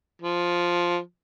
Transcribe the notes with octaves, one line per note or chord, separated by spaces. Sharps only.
F3